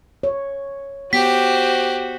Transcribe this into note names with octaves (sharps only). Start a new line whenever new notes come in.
C#5
B3 F#4 G4 C5 B6